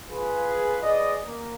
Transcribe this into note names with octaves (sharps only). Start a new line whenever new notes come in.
F4 G#4 B4
G#4 B4 D5 D#5
A#3